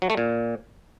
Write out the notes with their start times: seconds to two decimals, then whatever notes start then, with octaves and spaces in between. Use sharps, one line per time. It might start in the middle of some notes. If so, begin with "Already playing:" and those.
0.02 F#3
0.10 A3
0.17 A#2